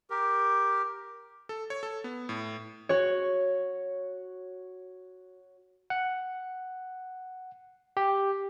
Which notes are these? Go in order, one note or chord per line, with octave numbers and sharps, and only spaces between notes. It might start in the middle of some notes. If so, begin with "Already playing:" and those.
G4 A#4
A4
C#5
A4
B3
A2
F#4 C#5
F#5
G4